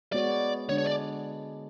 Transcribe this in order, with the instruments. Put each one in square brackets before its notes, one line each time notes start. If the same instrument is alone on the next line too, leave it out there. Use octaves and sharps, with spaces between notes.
[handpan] G#3 B3 F#4 C#5 [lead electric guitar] D5
[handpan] D3 G#3 D4 [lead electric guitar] C#5
[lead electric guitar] C#5
D5